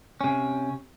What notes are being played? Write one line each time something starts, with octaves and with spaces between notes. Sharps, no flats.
C3 C#4